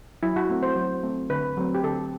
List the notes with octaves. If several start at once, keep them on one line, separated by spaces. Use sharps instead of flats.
F#3 E4
F#4
A3 C4
C5
F#3
A3 C4
D3 B4
F#3 A3 C4
G4
D3 A4